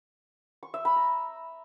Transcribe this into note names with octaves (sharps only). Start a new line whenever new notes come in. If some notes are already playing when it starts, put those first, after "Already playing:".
C#6
E5
B5
A#5